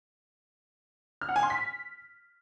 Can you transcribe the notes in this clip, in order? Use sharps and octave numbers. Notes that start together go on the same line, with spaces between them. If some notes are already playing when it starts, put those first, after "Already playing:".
F6
F#5
G#5
C6
B6